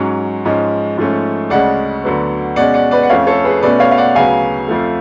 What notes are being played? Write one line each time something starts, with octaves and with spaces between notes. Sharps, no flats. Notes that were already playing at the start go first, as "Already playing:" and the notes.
Already playing: G#2 F#3 C#4
G#2 F3 G#3 C#4
G#2 F3 A3 C#4
D2 C#3 G#3 C#4 D5 F#5
D2 D3 F#3 B3
B2 G#3 C#4 D5 F#5
D5 F#5
B4 D5
F#5
F2 F3 A3 C#4 C#5 F5
A4 C#5
G#4 B4
B2 A3 C#4 B4 D5
C#5 F5
F5
D5 F#5
D2 C#3 F#3 B3 F5 G#5
F2 F3 A3